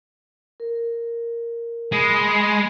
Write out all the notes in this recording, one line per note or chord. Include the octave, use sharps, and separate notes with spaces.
A#4
G#3 B5 D#6